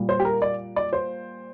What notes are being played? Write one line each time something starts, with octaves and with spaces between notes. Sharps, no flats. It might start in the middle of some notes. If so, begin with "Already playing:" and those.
Already playing: A#2 G3
C5
G4
A#4
D5
D5
C5